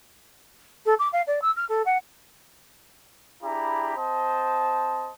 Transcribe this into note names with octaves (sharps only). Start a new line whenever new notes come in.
A4
D6
F5
D5
E6
F6
A4
F#5
D4 E4 G4 G#4 A#5 B5
C4 C5 D#5 A5